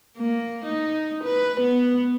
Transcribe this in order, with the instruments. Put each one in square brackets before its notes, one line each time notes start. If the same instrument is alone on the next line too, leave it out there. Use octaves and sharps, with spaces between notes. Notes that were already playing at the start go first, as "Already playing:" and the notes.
[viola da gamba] A#3
D#4
B4
B3